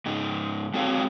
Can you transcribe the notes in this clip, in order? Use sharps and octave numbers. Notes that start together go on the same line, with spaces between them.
G#2 C#3 D#4
G#3 C4 F#4 A4 C#5 F5